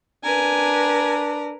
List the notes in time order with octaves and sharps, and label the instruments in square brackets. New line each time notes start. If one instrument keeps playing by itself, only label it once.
[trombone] D4 [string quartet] A#4 B4 [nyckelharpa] G#5